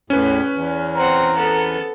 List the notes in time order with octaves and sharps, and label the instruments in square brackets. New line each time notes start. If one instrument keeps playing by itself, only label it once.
[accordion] E2 A2 [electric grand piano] C#4 B4
[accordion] E2
[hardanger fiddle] C4 F#5 [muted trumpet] A#5
[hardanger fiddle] B3 A4